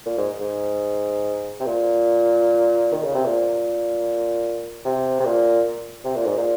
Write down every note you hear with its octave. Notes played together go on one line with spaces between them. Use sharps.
A#2
G#2
G#2
C3
A#2
D#3
C#3
C3
A#2
C3
C3
A#2
C3
A#2
G#2
A#2